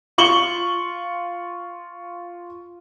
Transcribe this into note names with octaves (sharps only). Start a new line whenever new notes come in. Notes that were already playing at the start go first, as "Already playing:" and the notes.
F4 C#6 F#7 G7